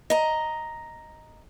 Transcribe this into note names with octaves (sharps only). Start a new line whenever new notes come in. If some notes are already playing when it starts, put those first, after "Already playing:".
D#5 A#5